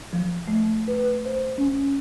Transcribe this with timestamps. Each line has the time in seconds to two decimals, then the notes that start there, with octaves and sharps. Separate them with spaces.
0.13 F3
0.48 A3
0.88 B4
1.25 C5
1.58 C#4